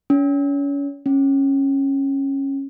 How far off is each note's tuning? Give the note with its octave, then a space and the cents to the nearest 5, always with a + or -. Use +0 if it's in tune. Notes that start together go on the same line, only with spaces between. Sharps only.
C#4 +30
C#4 -15